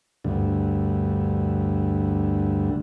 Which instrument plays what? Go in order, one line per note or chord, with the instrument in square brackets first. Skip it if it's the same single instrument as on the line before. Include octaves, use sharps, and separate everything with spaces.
[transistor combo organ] D2 G2